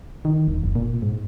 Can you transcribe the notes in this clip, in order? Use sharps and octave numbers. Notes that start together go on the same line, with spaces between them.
D#3
D#1
F#1
A#2
G#2